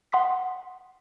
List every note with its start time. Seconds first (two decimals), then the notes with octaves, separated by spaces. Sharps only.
0.12 F#5 C6 D#6 B6